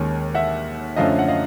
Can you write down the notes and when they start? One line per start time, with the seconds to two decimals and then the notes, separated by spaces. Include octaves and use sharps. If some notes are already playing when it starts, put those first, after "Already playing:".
Already playing: D#2 D#3 G#3 C#4
0.35 E5 F#5
0.96 F#2 D3 F3 A3 C#4 D#5 F5
1.19 F#5
1.28 D#5 F5